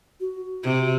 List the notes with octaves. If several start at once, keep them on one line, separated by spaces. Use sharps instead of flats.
F#4
C3